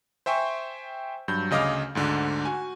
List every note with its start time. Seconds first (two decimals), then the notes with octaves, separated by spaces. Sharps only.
0.26 C5 E5 G5 G#5 C#6
1.28 G2 F#3 G6
1.51 D2 C#3 D#5 F5 D6 F6
1.95 D2 G#2 D3
2.45 F#4 G#5